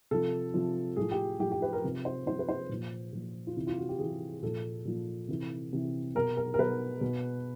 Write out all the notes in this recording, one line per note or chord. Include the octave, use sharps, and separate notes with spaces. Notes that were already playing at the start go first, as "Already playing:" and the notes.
C3 F3 A4
C3 F3
A2 F3 G#4
G4
A2 F3 G4
G4
B4
A#4
C3 F3
C5
C3 F3 C5
B4
C5
A#2 F3
A#2 F3
F4
C3 E3 E4
F4
F#4
G4
C3 E3 G#4
A#2 F3 A4
A#2 F3
C3 E3
C3 E3
B2 A#4
A#4
A#4
B2 B4
B2